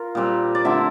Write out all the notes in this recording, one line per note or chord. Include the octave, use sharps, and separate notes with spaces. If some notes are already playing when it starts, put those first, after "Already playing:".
Already playing: F4 A#4
A#2 G3 C4
D5
D3 A3 C4 E4 E5